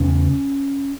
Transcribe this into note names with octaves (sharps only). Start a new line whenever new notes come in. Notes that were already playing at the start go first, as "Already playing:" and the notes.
Already playing: E2 C#3 C#4